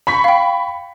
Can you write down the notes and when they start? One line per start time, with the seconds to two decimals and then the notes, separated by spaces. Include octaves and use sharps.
0.07 B5 C#6 B6
0.24 F5 G5